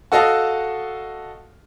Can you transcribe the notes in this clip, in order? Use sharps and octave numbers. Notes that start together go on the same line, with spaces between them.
F#4 A4 D#5 F5 A5